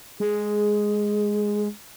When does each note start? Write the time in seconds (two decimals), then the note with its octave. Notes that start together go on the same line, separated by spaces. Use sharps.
0.20 G#3 G#4